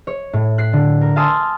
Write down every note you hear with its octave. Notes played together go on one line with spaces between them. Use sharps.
C#5
A2
F#6 B6 C7
D3
A#4
F5 G#5 A5 C6 D#6 E6